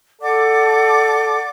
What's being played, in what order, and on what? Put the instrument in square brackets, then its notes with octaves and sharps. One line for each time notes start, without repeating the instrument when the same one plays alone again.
[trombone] A4 [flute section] D5 F#5 D6